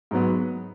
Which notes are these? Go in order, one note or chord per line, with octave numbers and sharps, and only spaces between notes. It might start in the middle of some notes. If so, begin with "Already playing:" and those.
G#2 F#3 B3